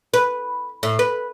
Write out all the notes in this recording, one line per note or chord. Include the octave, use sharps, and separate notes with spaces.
B4
A2
B4